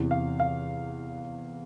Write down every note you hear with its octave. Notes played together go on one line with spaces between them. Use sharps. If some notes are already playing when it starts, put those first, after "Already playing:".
Already playing: E2 C3 E3
F5
F5